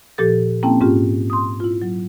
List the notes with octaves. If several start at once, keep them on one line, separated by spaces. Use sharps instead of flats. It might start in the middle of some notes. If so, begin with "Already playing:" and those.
A#2 F3 G4 A4 A6
A#3 C4 C#4 E4 G5 A5
G#2 C#4 F4 G4
C6 D#6
E4 F4
F#3